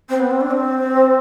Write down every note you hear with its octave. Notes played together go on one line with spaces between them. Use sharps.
C4
B3
C4
D4
C4